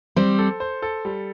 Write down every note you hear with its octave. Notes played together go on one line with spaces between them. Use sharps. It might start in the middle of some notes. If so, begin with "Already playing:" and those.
G3 C4 C5
A4
C5
A4
G3